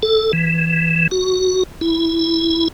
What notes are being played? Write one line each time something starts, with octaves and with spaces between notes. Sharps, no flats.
A4
E3
F#4
E4